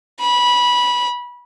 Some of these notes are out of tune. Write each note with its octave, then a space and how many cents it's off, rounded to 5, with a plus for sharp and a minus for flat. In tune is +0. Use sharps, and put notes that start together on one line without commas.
B5 -20